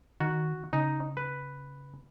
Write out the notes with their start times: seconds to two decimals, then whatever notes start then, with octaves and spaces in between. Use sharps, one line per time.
0.20 D#3 F#4
0.73 C#3 D#4
1.17 B4